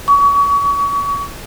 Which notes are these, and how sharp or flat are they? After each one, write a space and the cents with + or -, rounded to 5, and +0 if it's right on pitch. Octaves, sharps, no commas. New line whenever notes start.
C#6 +35